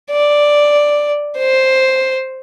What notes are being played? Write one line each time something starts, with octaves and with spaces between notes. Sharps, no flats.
D5
C5